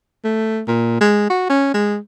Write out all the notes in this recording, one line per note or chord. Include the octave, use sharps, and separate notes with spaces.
A3
A#2
G#3
F#4
C#4
G#3